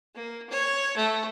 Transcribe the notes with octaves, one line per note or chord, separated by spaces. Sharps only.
A#3
C#5
A3